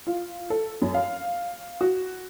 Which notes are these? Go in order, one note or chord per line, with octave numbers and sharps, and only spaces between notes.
F4
A4
F#2
F5
F#4